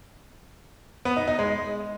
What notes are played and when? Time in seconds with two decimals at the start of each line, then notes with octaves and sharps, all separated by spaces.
1.05 B3
1.16 D#4
1.28 D#4
1.39 G#3